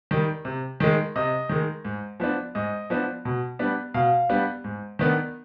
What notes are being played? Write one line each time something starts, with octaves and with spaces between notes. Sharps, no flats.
D#3 G3
C3
D#3 G#3
C3 D#5
D#3 G#3
G#2
F3 B3 D4
G#2 D#5
F3 B3 D4
B2
G3 B3 D4
B2 F5
G3 B3 D4
G#2
D#3 B3 D4